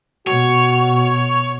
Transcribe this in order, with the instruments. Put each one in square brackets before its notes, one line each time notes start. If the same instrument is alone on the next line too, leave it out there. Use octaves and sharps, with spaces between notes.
[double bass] B2 [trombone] F#4 [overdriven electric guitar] C#5